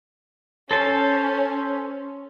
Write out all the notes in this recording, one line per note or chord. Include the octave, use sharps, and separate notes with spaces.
C#4 A4 C5 A5